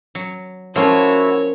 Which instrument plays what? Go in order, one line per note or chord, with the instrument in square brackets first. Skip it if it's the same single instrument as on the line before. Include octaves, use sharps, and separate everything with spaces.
[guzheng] F#3
[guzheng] F3 A#3 C#4 [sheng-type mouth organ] E4 F#4 E6 [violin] C#5